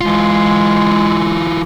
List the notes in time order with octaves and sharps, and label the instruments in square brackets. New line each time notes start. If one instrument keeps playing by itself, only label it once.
[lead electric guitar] E3 F4 [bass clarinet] G#3